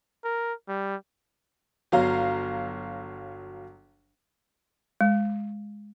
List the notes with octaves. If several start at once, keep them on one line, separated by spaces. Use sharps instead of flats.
A#4
G3
G1 F#3 F5 A#5
G#3